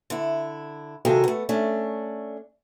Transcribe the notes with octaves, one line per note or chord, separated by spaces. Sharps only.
D3 E4
C3 D#3 F#3 G#3 F4 A4
A3 B3
A3 C#4 D4